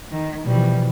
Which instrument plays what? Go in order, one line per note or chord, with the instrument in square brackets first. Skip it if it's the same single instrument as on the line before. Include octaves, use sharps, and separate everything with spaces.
[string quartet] D#3
[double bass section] B2 E3 [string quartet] F3 G3